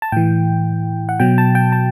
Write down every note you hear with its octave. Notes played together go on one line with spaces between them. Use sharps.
A5
A2 E3 G5
F#5
B2 F#3 G5
A5
G5
A5